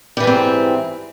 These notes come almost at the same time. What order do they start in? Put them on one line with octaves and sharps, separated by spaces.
G3 E3 G#2 C4